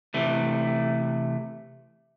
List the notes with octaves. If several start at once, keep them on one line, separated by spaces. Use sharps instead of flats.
C3 E3 A3